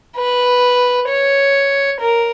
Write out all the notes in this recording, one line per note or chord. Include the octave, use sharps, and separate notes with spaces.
B4
C#5
A#4